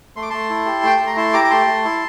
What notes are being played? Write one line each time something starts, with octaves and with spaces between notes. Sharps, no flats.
A3 C6
D6
A3 A5 C6
E4
G4
A3 G5
A3 A5
A#5
E4 A5 C6
G4 A#5 D6
D6
A3 A5 C6
A3
E4